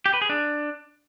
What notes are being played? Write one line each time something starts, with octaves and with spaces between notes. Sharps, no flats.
G4
B4
G#4
D4